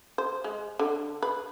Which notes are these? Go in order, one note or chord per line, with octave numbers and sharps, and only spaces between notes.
C5
G#3
D3
B4